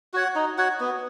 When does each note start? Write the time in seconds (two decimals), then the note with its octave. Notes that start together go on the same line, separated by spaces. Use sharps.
0.14 F#4 C#5 F#5
0.35 D#4
0.58 F#4 C#5 F#5
0.80 B3